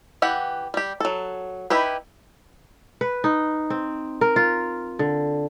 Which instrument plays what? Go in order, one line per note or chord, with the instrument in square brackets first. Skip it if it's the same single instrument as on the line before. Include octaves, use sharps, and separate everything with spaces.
[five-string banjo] E3 G4 F#5
G3 G4
F#3 A4
D#4 E4 G4 B4
[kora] B4
D#4
C4
A#4
F4
D3